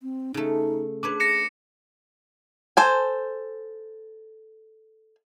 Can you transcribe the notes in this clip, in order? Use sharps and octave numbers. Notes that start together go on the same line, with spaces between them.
C4
C#3 A3 D#4
D4 G#4 B4 C#5 D6
A#6 C#7 E7
A4 C5 G#5